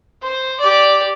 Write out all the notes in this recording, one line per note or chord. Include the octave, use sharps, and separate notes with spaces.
C5
G4 D5